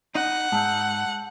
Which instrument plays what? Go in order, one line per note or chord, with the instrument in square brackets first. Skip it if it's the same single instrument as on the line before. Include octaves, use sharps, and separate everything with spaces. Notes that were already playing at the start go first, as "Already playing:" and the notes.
[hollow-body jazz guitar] D#4 [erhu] F#5
[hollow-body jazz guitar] G#2 [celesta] A5 E6 G6